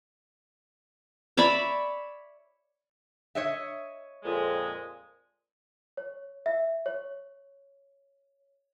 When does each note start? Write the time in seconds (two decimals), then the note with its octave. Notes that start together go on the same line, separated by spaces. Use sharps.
1.37 C#5 D5 E5 B5
3.35 C#5 D#5 E5
4.24 F2 A#2 G#3
5.97 C#5
6.46 E5
6.86 C#5